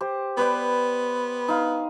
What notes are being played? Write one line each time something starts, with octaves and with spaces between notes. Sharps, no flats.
G4 C5
B3 B4 C5 D5
D#4 F5